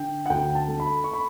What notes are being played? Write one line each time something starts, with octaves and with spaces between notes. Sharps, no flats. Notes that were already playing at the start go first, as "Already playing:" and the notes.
Already playing: D3 D4 G5
F#5
D2 G5
A5
A3
B5
C#6
B5